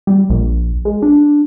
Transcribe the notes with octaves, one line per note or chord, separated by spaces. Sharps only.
G3
A#1
G#3
D4